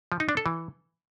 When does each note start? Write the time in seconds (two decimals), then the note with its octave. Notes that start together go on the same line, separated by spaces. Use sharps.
0.12 F3
0.20 D#4
0.29 D4
0.37 A4
0.46 E3